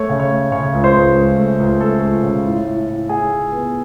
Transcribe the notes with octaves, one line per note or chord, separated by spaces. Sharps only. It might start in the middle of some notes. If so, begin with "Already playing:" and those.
Already playing: A3 C#5
C#3
C#5
A3
C#3 C#5
C#2
C5
C#2
C#2
A3
C#2
A3 A4
C#2
C#3
A2
A2
A2
A2 G#4
A2
B3